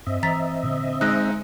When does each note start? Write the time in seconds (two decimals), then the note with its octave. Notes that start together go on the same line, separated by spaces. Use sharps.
0.07 G2 C4 D#5 E5
0.23 E3 A#5 A6 B6
0.63 A#2 D3 D4
1.01 G#3 D#4 F#6 A#6